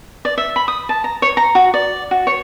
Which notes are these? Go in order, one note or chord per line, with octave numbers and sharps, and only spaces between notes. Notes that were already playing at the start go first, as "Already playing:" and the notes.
D5
E5
B5
D#6
A5
A#5
C#5
A#5
F#4
D5
F#4
C#5